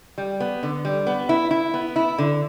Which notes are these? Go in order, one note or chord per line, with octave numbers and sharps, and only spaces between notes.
G3
B3
D3
G3
B3
E4
E4
B3
E4
D3